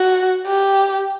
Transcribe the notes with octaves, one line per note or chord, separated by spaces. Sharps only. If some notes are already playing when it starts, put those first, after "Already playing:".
Already playing: F#4
G4